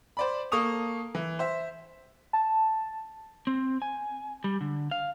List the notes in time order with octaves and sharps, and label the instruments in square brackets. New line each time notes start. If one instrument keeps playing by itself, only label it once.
[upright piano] C5 D5 B5
A#3 A4 C#6 D#6 F7
E3
C5 E5
[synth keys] A5
[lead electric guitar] C4
G#5
G3
D3
F5